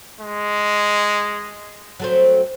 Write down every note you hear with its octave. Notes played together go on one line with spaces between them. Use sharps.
G#3
F#3 A3 C4